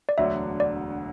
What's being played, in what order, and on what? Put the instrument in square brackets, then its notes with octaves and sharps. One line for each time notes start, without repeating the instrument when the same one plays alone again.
[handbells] D5
[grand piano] E1 D2 D3 F#3 [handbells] E5
[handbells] D5